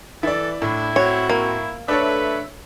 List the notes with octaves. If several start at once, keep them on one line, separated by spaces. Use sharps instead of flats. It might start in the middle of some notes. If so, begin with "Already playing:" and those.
E3 E4 A4 D5
A2 D4 E4
C4 F#4 C#5
A#3 E4
A3 D4 A4 B4 C#5 E5